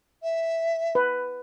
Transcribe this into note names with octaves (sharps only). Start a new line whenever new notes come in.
E5
B4